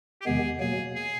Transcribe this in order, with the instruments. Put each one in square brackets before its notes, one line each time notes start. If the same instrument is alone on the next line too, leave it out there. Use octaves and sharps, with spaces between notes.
[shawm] G4
[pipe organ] E2 C3 D#3 G#3 B3 [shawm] G#4
[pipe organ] B2 F#3 A#3 [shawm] G#4
[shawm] G#4